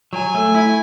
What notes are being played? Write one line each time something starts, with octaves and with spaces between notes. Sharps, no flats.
F#3 G#5
A3
E4